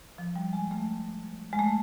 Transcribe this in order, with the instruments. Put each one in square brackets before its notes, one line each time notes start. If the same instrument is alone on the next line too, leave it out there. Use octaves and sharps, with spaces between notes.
[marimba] F3
G3
G#3
A3
G#3
A3